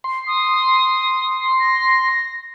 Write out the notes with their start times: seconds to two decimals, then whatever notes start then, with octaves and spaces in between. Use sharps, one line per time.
0.04 C6
0.27 D#6
1.60 A#6